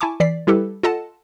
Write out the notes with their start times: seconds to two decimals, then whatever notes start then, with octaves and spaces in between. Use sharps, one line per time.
0.01 E4 G#5 A5 C#6 D6
0.20 E3 D5 B6 C7
0.47 G3 E4 G4 A4 B4
0.83 F4 A4 D#5 F#5 A5